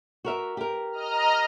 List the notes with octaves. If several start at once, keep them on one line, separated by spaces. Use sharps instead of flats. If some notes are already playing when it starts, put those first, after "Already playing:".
F#4 A#4 E5
G4 A#4
D#5 A#5 F6